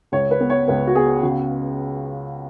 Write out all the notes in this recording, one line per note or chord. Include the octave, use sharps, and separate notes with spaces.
C#2 C#5
B4
B3
C#5
C#2 B4
F#4
B3 G#4
C#3 F#4